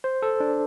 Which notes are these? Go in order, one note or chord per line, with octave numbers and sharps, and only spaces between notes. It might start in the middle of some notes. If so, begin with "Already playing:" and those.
C5
A4
D4